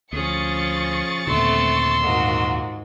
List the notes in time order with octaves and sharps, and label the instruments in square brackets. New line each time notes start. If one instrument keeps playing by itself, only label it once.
[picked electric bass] D2 [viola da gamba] F3 C#4 G#4 [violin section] C#6 A6 C#7
[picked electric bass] D#2 A#2 D3 [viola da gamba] A3 B3 C4 [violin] C6 E6
[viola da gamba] G#2 [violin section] F4 F#4 A#4